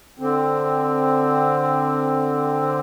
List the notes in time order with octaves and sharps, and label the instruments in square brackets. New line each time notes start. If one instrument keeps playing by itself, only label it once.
[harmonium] D3 C4